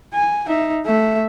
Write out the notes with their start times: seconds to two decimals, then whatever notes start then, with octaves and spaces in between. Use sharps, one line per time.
0.14 G#5
0.47 D#4 E5
0.86 A3 E5